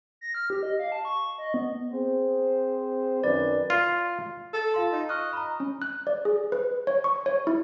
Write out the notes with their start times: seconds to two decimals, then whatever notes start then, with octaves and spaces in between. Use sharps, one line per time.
0.21 A#6
0.35 F6
0.50 G4
0.63 D#5
0.79 F5
0.92 A5
1.05 C#6
1.38 D#5
1.54 B3
1.93 C4 G#4 C5
3.24 F#2 D#3 B4 D5
3.70 F4
4.54 A4
4.74 F4 F5 C6
4.93 D#4
5.09 D#5 C#6 F6 F#6
5.33 A#5 B5
5.60 C#4
5.82 F#6
6.07 D5
6.25 G#4
6.52 B4
6.87 C#5
7.04 C#6
7.26 C#5
7.47 E4